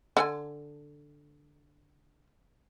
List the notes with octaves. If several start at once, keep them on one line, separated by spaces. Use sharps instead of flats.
D3 C#4 G#5